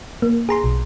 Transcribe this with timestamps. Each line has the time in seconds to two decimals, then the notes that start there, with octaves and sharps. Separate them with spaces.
0.22 A#3
0.49 G#4 A#5 C6
0.64 B1